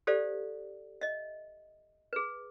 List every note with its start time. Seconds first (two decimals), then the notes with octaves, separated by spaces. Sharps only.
0.07 G4 A4 C5 D5 F5
1.01 D#5 E5
2.13 G#4 B4